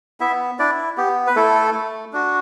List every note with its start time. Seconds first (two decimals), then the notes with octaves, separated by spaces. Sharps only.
0.20 B3 E4 E5
0.59 D4 E4 D5
0.97 B3 G4
1.27 B4
1.36 A3 E4 A4
1.74 A3
2.13 D4 F#4